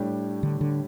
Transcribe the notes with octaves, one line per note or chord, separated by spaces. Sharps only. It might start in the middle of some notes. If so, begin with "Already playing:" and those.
Already playing: A2 G3 D4 G4
D3
D3